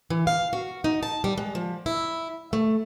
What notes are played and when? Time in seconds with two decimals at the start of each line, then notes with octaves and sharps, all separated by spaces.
0.10 E3
0.27 F5
0.53 F#4
0.84 D#4
1.03 A5
1.24 G3
1.38 G#3
1.55 F3
1.86 E4
2.53 A3